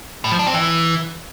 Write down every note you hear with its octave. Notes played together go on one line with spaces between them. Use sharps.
A2
F3
D4
C4
E3